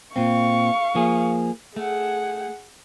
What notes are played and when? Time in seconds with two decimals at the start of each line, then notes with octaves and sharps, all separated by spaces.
0.16 A#2 C4 F5 C#6
0.95 F3 A#3 G#4
1.76 A3 G#4 F#5